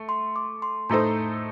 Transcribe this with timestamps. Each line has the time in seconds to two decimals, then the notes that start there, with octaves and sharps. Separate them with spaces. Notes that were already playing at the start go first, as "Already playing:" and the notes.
Already playing: A3
0.09 C6
0.36 D6
0.62 C6
0.89 A2 A3 D#4 A4 C5 A#5